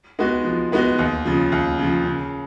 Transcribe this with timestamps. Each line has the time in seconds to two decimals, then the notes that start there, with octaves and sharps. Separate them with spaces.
0.19 G#3 B3 D#4 F#4
0.45 F3
0.72 G#3 B3 D#4 F#4
0.98 D#2
1.25 C#3 F3
1.52 D#2
1.79 C#3 F3
2.05 C#3